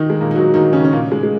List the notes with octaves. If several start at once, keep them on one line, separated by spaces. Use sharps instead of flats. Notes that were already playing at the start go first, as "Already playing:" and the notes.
Already playing: D#3 D#4
G#3
A#2 A#3
D#4
F#3 F#4
D#3 D#4
C#3 C#4
C#4
A#2 A#3
G#3
G#3